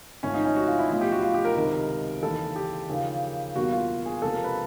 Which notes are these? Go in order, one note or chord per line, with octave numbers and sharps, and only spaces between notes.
G#1 G#2 F3 A3 C#4
D#4
C#4
F#4
F4
E4
B1 A2 F3 F4
G4
F#4
F4
G4
A#4
C#2 C3 D#3
D#2 C#3 E3 A4
G4
D#2 C#3 F3 A#3
E2 B2 G3 A#3 F#4
F4
G#4
C#2 C3 F3 A#3 A4
A#4
B4